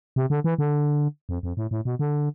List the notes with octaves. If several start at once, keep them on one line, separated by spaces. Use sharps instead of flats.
C3
D3
E3
D3
F2
F2
A2
A2
B2
D3